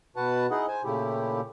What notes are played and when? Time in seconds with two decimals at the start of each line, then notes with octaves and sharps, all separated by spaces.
0.16 B2 F#4 B4 F#5 A5
0.51 D#4 E4 G#4 D#5 F#5
0.68 C5 G#5
0.84 A#2 C#3 A3 E4 G4